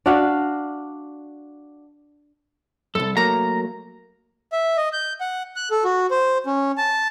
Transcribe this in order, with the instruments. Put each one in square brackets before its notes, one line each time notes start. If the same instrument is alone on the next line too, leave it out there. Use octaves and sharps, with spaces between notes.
[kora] D4 F#4 E5 F5
[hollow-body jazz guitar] C2 F#2 [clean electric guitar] A4
[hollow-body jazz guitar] F#3 A3 A#3 [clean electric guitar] A#5
[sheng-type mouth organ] E5
D#5
G6
F#5
F#6
A4
F#4
C5
C#4
A5